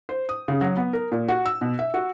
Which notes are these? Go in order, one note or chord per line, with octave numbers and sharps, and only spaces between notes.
C5
D#6
C#3
F#3
B3
A#4
A#2
F#4
E6
B2
E5
F#4